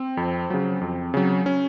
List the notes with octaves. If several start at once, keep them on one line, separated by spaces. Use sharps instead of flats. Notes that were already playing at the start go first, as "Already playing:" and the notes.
Already playing: C4
F2
C#3 F#3
F2
C#3 F#3
C#4